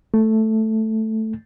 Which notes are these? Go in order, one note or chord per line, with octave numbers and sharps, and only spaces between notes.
A3